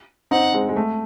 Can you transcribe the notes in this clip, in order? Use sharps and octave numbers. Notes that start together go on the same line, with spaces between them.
C4 D#4 F#5
G#3 C4
G#3
A3